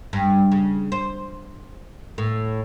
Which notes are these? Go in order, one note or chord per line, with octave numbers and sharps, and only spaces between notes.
G2
C#3
C5
A2